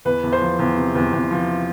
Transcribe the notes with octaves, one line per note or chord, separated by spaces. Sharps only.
E2 B4
E2
C5
F3
E2
C3
E2
E2
F3